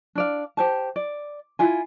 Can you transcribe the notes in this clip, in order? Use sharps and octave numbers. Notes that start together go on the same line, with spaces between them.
D4 D5 F5
G4 C5 A5
D5
E4 F4 G#5